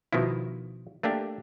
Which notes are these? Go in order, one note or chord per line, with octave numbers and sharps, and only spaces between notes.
B2 D#3 F3 E4
A3 A#3 D4 G4